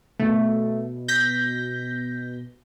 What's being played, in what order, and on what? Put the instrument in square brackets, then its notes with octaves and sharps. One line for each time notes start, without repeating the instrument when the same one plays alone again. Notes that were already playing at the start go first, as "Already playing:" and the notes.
[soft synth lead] B2 [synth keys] A3
[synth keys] G6 A#6 B6